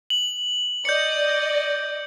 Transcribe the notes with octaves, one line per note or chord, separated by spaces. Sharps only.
F#7
D5 D#5 G6 C#7